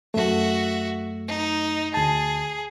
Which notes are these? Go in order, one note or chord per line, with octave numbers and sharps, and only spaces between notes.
F#2 A3 F#4 E5
D#4
D2 G#4 A5